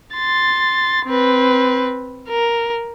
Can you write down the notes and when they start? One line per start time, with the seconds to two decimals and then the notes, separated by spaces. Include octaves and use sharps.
0.14 C6 A6
1.06 C4 B4
2.29 A#4